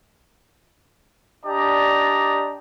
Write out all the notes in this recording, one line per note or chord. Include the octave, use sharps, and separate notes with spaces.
D4 G4 D5 D#5 A#5